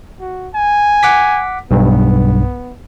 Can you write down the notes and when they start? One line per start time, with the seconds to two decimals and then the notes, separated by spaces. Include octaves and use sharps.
0.20 F#4
0.55 G#5
1.03 F#5 D6 B6
1.71 B1 G2 B3